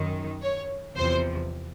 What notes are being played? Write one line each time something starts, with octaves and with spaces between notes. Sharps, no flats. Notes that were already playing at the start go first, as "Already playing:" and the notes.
Already playing: F#2 D#3
C#5
E2 C3 F3 C5